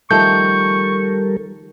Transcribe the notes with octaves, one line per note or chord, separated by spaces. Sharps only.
D#3 F3 G3 A3 A4 A#4 C#6 G6